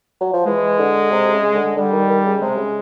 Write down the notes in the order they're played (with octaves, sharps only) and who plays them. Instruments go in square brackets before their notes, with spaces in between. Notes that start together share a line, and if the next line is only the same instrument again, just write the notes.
[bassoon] F#3
F3
[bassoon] E3 [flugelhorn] G#3
[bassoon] D3
C3
C#3
D3
[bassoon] D3 [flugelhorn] G3
[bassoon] D#3
D#3
C#3
[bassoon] C3 [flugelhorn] G#3
[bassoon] C#3